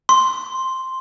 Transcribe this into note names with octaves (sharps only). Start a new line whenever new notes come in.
C6